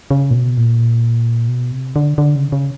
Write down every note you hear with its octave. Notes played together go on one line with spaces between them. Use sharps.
C#3
A#2
B2
A#2
B2
C3
D3
D3
C#3
C#3